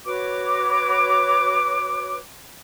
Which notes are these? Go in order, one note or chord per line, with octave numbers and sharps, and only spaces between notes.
F#4 B4 C#5 D6